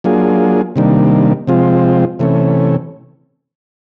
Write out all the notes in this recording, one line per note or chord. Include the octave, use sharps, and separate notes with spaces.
F#3 A#3 D4 F4 G#4
C3 D#3 G3 A#3 D4
C3 F3 G#3 C4 F4
C3 E3 A3 C#4